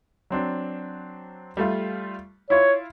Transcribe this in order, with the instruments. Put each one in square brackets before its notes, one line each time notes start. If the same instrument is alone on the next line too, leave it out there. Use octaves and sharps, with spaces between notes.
[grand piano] F#3 C4 D4
G3 A3 F4
[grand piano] E4 F4 [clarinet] C#5